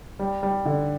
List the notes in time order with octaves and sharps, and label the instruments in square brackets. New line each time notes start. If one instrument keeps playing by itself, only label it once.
[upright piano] G3
G3
D3